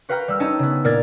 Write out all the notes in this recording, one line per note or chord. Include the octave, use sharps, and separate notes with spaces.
F#4 B4 F5 G5 A#5 F6
G3 E6 F6
C#4 D#4 A5 E6 D#7
C#3 B3
A#2 A#3 D5 F6 G#6 A6